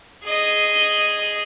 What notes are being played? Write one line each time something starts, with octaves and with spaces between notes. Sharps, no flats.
G#4 D#5